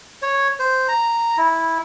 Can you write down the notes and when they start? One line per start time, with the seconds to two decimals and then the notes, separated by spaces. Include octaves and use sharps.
0.22 C#5
0.59 C5
0.88 A#5
1.37 E4